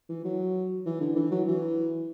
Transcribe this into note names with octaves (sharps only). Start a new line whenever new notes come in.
E3
F#3
E3
D3
E3
F#3
E3